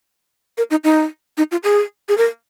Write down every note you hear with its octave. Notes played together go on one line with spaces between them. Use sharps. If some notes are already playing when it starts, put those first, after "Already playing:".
A#4
D#4
D#4
D#4
F4
G#4
G#4
A#4